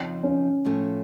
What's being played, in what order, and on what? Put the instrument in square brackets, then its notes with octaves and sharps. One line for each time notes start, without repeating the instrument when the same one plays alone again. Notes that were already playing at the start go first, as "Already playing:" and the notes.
Already playing: [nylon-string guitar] F2 C#3 F3 C4 D#4
[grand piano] C#4
[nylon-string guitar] A2 F3 A3 C#4